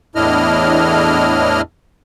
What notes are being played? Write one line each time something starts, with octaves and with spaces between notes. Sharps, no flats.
E2 A2 D4 E4 D#5 F6